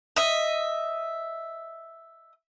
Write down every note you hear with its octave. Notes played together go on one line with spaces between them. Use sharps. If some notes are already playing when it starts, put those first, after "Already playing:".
D#5 E5